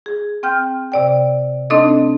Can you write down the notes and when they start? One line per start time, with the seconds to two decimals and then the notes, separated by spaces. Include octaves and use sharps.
0.06 G#4
0.43 C4 G5 F6 G6
0.92 C3 D5 G5
1.70 A3 C4 D4 D#4 A4 D#5